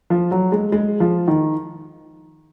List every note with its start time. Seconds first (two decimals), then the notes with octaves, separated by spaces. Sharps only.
0.10 F3
0.31 F#3
0.52 G#3
0.72 G#3
1.00 F3
1.28 D#3